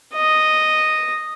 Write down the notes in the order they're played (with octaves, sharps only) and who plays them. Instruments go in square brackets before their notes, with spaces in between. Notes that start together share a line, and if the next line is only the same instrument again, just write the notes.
[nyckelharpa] D#5